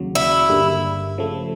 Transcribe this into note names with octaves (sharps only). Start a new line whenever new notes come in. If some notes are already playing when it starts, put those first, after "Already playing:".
Already playing: D#2 C#3 F#3
E4
G1 G2 D3 G3 A#3
C#3 F3 A3